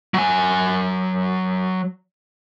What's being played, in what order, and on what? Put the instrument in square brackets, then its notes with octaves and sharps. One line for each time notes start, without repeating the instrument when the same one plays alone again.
[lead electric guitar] F#3 G#5